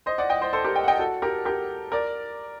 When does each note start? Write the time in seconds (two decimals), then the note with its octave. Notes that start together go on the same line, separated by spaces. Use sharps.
0.06 C5 D#5
0.18 D5 F#5
0.30 D#5 G5
0.41 C5 D#5
0.53 A4 C5
0.65 G4 A#4
0.76 D#5 G5
0.84 F#5
0.88 D#5 G5
0.99 F#4 A4
1.22 G4 A#4
1.45 G4 A#4
1.92 A#4 D5